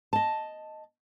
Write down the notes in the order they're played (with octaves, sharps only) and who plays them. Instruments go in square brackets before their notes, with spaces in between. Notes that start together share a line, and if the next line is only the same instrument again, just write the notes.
[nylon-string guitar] D#5 A5